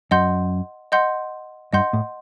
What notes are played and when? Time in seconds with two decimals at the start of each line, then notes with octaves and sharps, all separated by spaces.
0.11 F#2 D#5 F#5 C6 G6
0.92 D#5 F#5 C6 G6
1.73 G2 D#5 F#5 C6 G6
1.93 A2